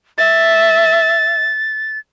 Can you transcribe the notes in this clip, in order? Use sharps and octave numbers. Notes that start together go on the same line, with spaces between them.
E5 A6